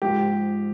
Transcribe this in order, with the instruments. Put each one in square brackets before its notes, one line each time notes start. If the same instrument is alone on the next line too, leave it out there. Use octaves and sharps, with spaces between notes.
[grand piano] G#2 F3 G4